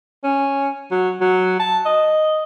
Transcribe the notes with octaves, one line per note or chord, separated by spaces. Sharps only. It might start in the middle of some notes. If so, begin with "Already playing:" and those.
C#4
F#3
F#3
A5
D#5